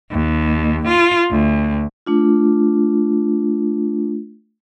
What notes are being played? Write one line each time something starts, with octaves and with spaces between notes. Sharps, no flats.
D#2
F4
D2
A3 D4 F4